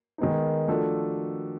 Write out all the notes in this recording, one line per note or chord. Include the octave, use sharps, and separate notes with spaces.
D#3 G#3 B3 D#4
F3 A3 D4 F#4 A4